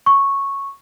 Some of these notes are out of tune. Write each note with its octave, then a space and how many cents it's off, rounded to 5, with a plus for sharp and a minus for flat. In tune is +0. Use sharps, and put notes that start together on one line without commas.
C#6 -5